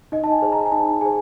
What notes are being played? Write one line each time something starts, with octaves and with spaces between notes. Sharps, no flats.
D#4 D#5
A5
G#5
G#4 C5
A#5
G#5
D#4 A5
G#4 C5 G#5